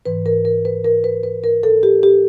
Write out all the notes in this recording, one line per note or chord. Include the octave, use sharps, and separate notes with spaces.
G#2 E3 B4
A#4
A#4
B4
A#4
B4
B4
A#4
A4
G4
G4